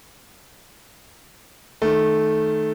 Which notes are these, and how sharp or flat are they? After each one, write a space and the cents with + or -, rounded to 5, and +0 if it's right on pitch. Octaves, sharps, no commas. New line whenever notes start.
D#3 -10 A3 -10